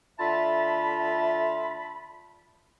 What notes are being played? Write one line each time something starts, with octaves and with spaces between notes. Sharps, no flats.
D3 A3 F4 E5 A5 B5